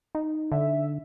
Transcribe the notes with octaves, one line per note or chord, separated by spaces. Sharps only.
D#4
D3 E5